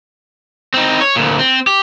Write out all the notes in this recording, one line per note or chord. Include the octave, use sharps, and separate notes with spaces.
C4 D#4
C#5
D2 A#2
C4
G4